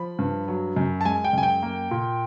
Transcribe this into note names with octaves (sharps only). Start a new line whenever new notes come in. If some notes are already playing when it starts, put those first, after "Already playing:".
Already playing: F3 B5
G2
F#3
F#2
A5
G#3 G#5
G5
F#2 G#5
G5
A#3
A#2